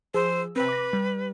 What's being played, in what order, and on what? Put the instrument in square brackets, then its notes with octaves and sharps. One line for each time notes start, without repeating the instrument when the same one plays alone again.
[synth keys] F3 G#4 E6 [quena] C5
[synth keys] C3 C4 [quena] B4
[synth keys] D6 A#6
G3